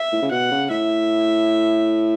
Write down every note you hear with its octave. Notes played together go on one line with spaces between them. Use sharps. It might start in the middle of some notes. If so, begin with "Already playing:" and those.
Already playing: E5
A2
C#3
B2 F#5
C#3
A2 E5